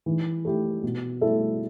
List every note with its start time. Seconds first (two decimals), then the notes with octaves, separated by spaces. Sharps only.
0.06 E3
0.45 A3 E4 G4
0.83 B2
1.21 A3 E4 A4 E5